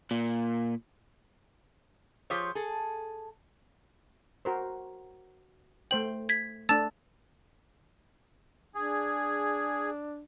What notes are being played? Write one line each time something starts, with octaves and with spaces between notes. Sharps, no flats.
A#2
F3 F4 G4 G#4 C5 C#5
G#4 A4
F#4 A#4 C5
A3 C5 G5 F#7
G#6 B6
A3 D4 A5 E6 A6
D4 G#4